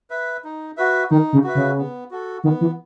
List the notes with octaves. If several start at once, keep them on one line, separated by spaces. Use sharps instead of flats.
B4 E5
D#4
F#4 B4 E5
D#3 D#4
C#3
F#4 B4 E5
C#3
B3
F#4 A4
D#3 B3
E3